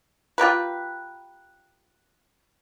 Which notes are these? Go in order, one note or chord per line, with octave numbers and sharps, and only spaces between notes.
F4 G4 A#4 B4